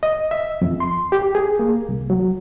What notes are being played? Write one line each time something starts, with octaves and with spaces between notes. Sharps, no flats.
D#5
E5
F2
C6
G4
G#4
A#3
C2
F#3